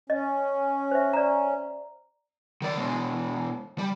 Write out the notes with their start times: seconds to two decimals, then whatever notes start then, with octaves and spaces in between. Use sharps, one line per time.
0.10 C#4 D#5
0.91 C5 E5
1.13 D5 A#5
2.62 D#3 D5
2.78 B2 G#3
3.78 G3